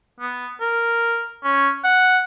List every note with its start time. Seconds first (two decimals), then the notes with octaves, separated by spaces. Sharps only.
0.20 B3
0.61 A#4
1.44 C#4
1.84 F#5